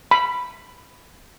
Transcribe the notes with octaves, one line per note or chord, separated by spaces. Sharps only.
B5